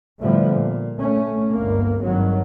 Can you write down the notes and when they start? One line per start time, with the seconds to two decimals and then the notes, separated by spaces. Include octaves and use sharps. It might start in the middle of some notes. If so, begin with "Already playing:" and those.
0.20 A2 D3 F3 G3 A3 B3
0.50 A#2
1.00 A3 C#4
1.55 G1 D2 A#3
2.02 G#1 G2 D#3 F#3